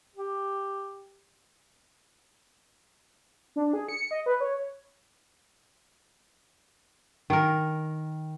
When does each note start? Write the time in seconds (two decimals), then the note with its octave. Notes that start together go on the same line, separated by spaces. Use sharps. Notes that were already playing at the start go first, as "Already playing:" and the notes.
0.16 G4
3.56 D4
3.73 G#4
3.89 C#7
4.11 D#5
4.26 B4
4.40 C#5
7.30 D#3 A#4